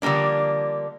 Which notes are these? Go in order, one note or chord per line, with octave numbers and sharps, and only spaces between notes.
D3 F3 G3 A#3 D4